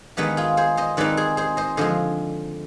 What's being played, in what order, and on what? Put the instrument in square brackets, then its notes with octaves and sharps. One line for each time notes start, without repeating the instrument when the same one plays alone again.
[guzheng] D#3 G#3 B3 D#4 G4 B4
F4 G#4
G#4 C5
C5 D#5
D#3 G#3 C4 D#4 B4 D5
G#4 C5
G#4 C5
C5 D#5
D3 F3 G#3 C5 D#5